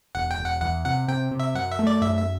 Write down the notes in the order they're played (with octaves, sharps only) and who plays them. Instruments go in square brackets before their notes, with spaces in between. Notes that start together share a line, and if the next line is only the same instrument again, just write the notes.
[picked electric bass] E1 [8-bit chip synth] F#5
[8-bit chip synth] G5
[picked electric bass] E1
[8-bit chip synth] F#5
[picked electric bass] E2 [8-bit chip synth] F#5
[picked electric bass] C3 [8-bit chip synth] F#5
[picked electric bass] C3 [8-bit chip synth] G5
[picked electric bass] C3
[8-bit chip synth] E5
[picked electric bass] F#2 [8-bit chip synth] F#5
[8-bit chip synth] E5
[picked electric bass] A3
[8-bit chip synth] D5
[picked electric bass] F#2 [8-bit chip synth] E5
[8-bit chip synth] E5